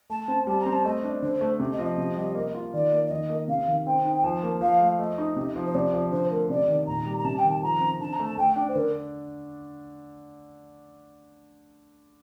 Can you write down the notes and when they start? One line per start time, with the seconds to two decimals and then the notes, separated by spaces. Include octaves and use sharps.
0.10 A3 A5
0.28 C4
0.47 G3 A5
0.60 A#5
0.66 C4
0.72 A5
0.84 A3 D#5
1.03 D4
1.22 D3 C5
1.41 A3
1.60 C3
1.72 D#5
1.79 F3
1.85 D#5
1.98 C3
2.16 G3
2.35 A#3
2.54 F4
2.73 D#3 D5
2.92 A#3
3.07 D5
3.10 D#3 D#5
3.30 A#3
3.48 C3 F5
3.68 D#3
3.86 C4 G5
4.05 D#4
4.15 G5
4.24 F3 A5
4.43 A#3
4.61 F3 F5
4.80 A3
4.99 A3 D#5
5.18 D#4
5.36 C3
5.56 F3
5.66 C5
5.74 C3 D5
5.94 F3
6.12 D3 C5
6.30 A3 A#4
6.50 C3 D5
6.68 D#3
6.87 A#2 A#5
7.05 G3
7.18 A#5
7.24 C3 A5
7.37 G5
7.44 D#3
7.50 A5
7.62 F3 A#5
7.81 C4
8.00 D3 A5
8.12 A#5
8.19 A3
8.25 A5
8.37 A3 G5
8.56 D4
8.68 C5
8.75 D3 A#4